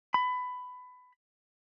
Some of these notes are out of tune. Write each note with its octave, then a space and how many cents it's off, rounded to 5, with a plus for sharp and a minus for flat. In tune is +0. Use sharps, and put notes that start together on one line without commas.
B5 +20